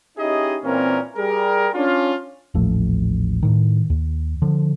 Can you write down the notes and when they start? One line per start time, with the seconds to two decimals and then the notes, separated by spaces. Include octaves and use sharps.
0.18 C#4 D#4 E4 G4 G#4 D#5
0.63 A#2 E3 A#3 C4 C#4 A#4
1.17 G3 G#4 A#4
1.74 C#4 D4 F4
2.54 D#1 A1 F3 A3
3.43 A2 D#3
3.90 D#2
4.42 D3 F3